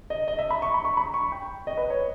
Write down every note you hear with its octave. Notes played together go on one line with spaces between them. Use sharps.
D#5
D#5
E5
B5
C#6
B5
C#6
B5
C#6
G5
D#5
B4
C#5